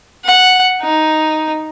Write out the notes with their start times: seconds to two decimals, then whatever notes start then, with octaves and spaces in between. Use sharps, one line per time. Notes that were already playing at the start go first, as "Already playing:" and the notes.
0.25 F#5
0.81 D#4